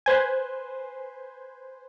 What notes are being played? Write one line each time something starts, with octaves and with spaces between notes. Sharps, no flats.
B4 C5 G#5